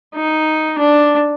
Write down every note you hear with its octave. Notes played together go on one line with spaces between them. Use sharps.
D#4
D4